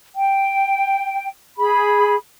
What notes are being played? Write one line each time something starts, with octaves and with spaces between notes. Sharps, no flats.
G5
G#4 B5